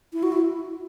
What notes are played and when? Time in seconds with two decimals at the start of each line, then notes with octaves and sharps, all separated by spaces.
0.13 E4
0.23 F#4
0.32 E4